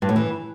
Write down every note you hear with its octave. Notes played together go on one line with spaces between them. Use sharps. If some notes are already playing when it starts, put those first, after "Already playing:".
G2
A2
E3